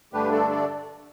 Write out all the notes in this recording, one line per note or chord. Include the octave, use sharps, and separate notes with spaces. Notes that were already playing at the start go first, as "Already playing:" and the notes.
G2 D3 A3 D4 G4 B4
A4 D5
A4 D5